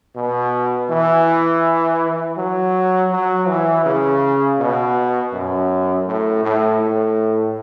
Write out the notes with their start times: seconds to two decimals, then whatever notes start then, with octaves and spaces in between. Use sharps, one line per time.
0.16 B2
0.90 E3
2.38 F#3
3.12 F#3
3.48 E3
3.85 C#3
4.59 B2
5.33 F#2
6.07 A2
6.43 A2
6.80 A2